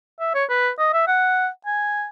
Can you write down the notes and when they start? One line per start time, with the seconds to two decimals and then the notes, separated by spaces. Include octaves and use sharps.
0.20 E5
0.34 C#5
0.49 B4
0.79 D#5
0.93 E5
1.07 F#5
1.66 G#5